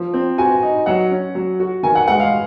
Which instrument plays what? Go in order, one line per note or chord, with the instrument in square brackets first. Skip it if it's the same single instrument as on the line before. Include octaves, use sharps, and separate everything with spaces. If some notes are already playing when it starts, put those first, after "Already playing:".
Already playing: [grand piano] F3
C4
[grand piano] F#4 [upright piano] G#5
[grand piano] D#4
[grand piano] F#3 [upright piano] F#5
[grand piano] C#4
F#3
F#4
[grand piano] D#3 [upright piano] G#5
[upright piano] F#5
[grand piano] G#3 [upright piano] F#5
[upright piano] F5